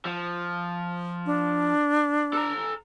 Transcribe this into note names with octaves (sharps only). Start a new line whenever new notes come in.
F3
D4
A4 A#5